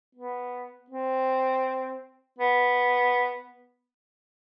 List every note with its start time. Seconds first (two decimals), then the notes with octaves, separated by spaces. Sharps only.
0.15 B3
0.90 C4
2.38 B3